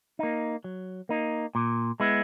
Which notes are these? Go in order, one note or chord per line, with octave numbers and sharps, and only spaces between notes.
A#3 D#4
F#3
A#3 D#4
A#2
G#3 B3 E4